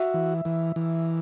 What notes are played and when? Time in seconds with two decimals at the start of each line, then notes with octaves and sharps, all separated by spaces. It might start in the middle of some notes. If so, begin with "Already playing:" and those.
Already playing: F#4 E5
0.14 E3
0.45 E3
0.76 E3